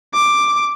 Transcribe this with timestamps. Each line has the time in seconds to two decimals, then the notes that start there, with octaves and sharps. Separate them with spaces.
0.14 D6